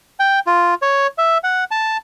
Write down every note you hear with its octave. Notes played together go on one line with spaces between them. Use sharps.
G5
F4
C#5
E5
F#5
A5